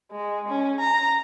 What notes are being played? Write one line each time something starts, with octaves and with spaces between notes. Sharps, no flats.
G#3
C#4
A#5